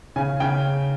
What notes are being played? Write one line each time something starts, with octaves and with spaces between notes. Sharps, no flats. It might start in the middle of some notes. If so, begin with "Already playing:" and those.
C#3 G#5
C#3 G5